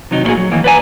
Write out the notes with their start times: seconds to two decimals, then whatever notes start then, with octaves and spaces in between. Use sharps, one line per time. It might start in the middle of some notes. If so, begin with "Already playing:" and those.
0.11 C3 D#3 F#3 D#4
0.24 A#2 G3 A3 A#3 F#4 G#4
0.37 F#3
0.51 D#3 E3 A#3 B3
0.64 B4 C5 D5 F5 G#5 A#5